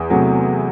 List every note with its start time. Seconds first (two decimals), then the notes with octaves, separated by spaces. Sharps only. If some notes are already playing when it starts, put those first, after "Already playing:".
Already playing: E2
0.10 C3 F#3 A3